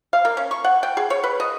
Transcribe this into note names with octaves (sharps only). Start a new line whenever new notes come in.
F5
A#3
C#4
C#6
F#5
G5
G#4
C#5
B4
D#5